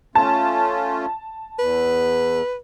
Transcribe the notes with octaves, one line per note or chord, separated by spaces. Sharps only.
A3 C#4 F4 A5
E2 B4